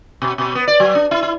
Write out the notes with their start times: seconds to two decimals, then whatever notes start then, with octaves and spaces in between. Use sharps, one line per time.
0.22 B2
0.38 B2
0.55 B3
0.68 D5
0.80 F#3
0.95 D4
1.11 E4
1.23 E4